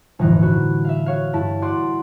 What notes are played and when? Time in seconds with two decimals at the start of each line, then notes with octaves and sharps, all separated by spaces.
0.19 G1 F2 A2 D3 E3 D#4
0.42 F#4 B5
0.85 E5 F5
1.06 F#4 C#5 F5
1.33 G2 E4 A5 B6
1.62 F#4 D5 F#5 C6 F#6